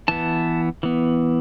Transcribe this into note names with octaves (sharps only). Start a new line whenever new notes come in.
E3 B3 A5
E3 B3